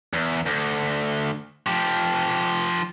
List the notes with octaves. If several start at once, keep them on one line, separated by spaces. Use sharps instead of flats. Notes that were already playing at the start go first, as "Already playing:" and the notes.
E2
D2
F3 G4